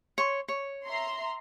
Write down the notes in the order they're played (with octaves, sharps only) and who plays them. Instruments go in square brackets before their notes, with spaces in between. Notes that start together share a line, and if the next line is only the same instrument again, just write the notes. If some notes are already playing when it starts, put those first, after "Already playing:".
[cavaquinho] C#5 C6
C#5
[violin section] E5 A#5 C6